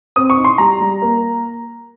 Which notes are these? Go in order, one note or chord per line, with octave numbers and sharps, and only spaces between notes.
C4 D#6
C#6
D#4
C6
G3 A#5
G3
A#3